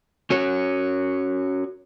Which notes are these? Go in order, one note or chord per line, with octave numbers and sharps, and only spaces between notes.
C#4 F#4 C#5